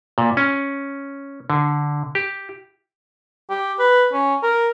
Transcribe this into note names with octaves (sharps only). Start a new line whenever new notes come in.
A#2
C#4
D3
G4
G4
B4
C#4
A#4